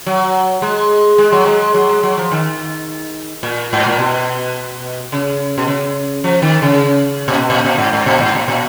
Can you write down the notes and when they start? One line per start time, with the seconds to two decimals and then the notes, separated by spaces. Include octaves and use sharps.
0.06 F#3
0.62 G#3
1.18 G#3
1.32 F#3
1.46 G#3
1.74 F#3
1.89 G#3
2.03 F#3
2.18 F3
2.32 D#3
3.43 A#2
3.73 G#2
3.87 A#2
3.99 B2
5.12 C#3
5.58 B2
5.67 C#3
6.24 F3
6.42 D#3
6.62 C#3
7.28 A#2
7.37 B2
7.50 A#2
7.65 A#2
7.78 G#2
7.93 G#2
8.06 A#2
8.21 G#2
8.35 A#2
8.48 A#2